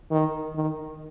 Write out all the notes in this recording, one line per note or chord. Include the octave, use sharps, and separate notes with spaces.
D#3
D#3